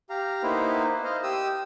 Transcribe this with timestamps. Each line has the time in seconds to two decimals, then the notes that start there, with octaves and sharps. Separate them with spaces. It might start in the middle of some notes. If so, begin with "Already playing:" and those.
0.10 G4 F5 A#5
0.43 A#3 B3 D#4 E4 B4 C5
1.04 C5 D#5 F5
1.23 G4 D#6 E6